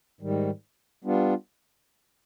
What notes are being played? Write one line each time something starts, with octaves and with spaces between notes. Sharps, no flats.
G#2 D#3 G3
G3 B3 D4 F4